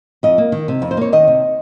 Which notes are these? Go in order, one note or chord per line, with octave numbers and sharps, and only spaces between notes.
F2 D#5
A#3
D#3
C3
F2
C5
A#3 C#5
D#3 D#5
C3